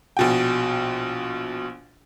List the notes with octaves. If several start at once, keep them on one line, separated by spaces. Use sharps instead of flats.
A#1 B2 G5